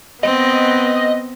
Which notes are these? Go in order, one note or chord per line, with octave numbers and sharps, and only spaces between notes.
B3 C4 D#5